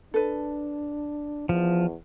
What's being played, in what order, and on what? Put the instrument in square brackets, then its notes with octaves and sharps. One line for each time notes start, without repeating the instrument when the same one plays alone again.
[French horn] D4 [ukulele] A4 B4
[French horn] E2 [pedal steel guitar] F3